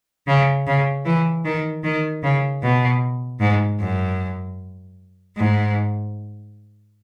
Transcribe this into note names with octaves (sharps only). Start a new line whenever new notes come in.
C#3
C#3
E3
D#3
D#3
C#3
B2
G#2
F#2
G#2